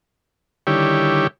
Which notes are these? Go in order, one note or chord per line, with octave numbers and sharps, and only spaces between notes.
D3 D#3 G3 E4 G4 C#5